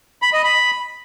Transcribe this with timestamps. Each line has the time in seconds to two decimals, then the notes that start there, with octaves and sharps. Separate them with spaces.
0.22 B5
0.33 D#5
0.44 B5